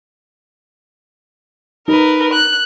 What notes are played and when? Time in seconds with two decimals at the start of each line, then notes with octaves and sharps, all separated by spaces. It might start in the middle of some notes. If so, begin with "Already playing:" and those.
1.88 D#4 A#4 B4
2.33 F#6